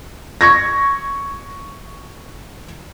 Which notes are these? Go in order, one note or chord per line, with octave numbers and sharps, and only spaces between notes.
C#6 G#6 A#6